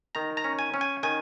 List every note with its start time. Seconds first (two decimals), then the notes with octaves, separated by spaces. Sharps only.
0.15 D#3 A#5
0.37 A#5
0.44 C#4
0.59 G#5
0.74 C#4
0.81 G#5
1.03 D#3 G#5